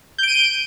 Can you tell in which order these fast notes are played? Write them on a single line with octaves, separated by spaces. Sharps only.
G6 D7 D#7